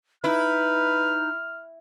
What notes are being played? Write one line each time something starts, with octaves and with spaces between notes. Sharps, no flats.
D#4 E4 B4 F6